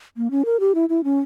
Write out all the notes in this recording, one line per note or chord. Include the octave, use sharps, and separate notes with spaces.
A#3
C#4
A#4
G4
E4
E4
C#4